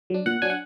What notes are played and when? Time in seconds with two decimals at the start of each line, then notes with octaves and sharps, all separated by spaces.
0.10 F#3 D4
0.26 A#2 F#5
0.42 F#3 D4 G#5
0.50 F#5